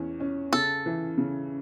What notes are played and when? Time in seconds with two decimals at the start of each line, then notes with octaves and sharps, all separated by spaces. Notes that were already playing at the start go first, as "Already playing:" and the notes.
Already playing: E2 C#4
0.20 C#4
0.53 C#3 A4
0.86 E3
1.18 C#3